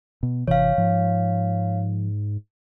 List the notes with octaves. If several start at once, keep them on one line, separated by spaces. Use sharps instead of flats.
B2
G#1 C3 E3 C#5 F5
G#2 F3